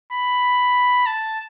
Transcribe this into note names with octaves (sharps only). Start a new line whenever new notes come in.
B5
A5